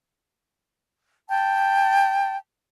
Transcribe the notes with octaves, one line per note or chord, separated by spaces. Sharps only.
G5 A5